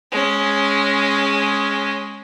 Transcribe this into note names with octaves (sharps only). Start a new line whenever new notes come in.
G#3 C#4